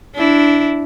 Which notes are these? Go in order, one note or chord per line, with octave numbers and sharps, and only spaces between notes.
D4 E4